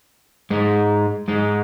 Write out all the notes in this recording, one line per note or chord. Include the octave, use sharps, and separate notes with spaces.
G#2 G#3
G#2 G#3